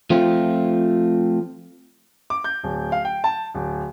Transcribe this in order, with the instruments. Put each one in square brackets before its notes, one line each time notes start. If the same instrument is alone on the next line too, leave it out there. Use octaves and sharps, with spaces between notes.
[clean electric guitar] F3 A3 C4 F4
[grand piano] D6
G6
D1
F5
G5
A5
D1